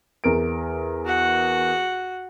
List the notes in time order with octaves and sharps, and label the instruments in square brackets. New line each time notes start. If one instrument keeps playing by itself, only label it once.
[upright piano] E2 A#4 D7
[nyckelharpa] F#4 F#5